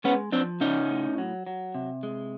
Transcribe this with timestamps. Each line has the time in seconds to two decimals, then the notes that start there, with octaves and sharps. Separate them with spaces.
0.04 G#3 B3 C#4
0.32 F3 C4 D4
0.60 C#3 C#4 D#4
0.89 A2
1.18 F#3
1.47 F#3
1.75 C3
2.03 G#3